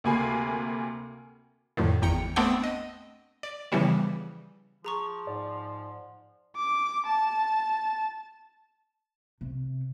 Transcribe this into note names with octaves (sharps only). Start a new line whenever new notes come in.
D2 C3 A#3 G#5 B5 C7
F2 A2 D3 D#3
G#1 E2 G5 A#5 C#7
A3 B3 C4 D4 F#5 G5
D#5
D5
C#3 E3 F3 G3 B3
F3 G#4 A#5 C#6
G#2 D5
D6
A5
C3